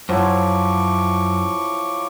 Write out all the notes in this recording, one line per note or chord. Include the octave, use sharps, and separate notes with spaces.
F#2 F3 F#3 E4 C#6 D6